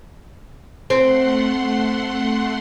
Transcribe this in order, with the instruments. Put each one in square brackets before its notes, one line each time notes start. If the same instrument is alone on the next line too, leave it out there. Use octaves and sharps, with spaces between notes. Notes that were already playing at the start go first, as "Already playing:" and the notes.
[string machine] A3 F#5 C6 [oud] C4